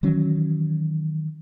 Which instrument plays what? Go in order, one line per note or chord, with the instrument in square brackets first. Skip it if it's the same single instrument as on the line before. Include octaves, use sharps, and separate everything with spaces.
[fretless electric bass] D#3 E3 F#3 C#4